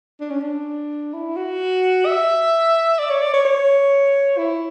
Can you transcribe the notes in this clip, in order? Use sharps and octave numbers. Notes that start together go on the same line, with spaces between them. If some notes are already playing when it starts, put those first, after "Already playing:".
D4
C#4
D4
E4
F#4
E5
D5
C#5
D5
C#5
C#5
E4